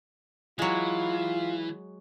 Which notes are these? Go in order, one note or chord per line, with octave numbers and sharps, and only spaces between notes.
E3 F#3 G#3 F4